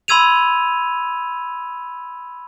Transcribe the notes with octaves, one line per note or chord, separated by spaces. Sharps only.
B5 C6 E6 G#6 D#7 F7